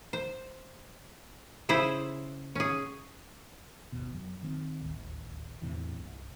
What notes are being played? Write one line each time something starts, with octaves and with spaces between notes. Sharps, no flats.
C5
C#3 E4 G#4 C5
C#4 G#4
G1 D#2 B2
F#2 F#3
D#3 A#3 C4
D1 G#1 D#2
E2 A2 C3 E3
C2 G2